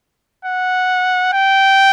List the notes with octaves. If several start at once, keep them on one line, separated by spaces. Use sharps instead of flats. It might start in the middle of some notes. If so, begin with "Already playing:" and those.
F#5
G5